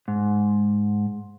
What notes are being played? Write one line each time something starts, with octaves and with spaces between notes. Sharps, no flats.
G#2